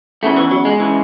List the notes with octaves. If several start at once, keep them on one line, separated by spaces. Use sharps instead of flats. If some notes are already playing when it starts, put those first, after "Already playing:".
E2 C#3 E3 A3
E3
F#3
G#3
C#3 E3